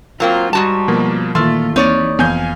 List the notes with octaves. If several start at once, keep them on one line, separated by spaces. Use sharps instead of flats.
F#3 A#3 C4 F4
G#2 G3 F#4 A5
B2 F3 A#3
A#2 D#3 E3 A3 F4 C6 F6
D#2 E3 C4 D#4 C#5 D5
F1 F2 E3 B3 F5 G#5 G6